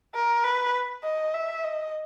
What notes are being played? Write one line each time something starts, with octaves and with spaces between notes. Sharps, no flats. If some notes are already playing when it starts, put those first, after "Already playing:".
A#4
B4
D#5
E5
D#5